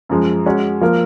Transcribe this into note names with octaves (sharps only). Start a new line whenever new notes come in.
F#2 F3 G#3
G#3 C#4 F#4
F3 A#3 F4 A#4